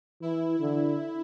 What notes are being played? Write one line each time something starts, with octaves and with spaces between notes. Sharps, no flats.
E3 E4
D3